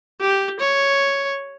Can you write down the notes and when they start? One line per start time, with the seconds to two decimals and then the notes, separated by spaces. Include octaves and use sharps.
0.20 G4
0.60 C#5